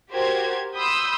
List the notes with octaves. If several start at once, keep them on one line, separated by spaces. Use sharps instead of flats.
F#4 G4 A#4 C5 G#6
B5 C6 D#6 E6 G6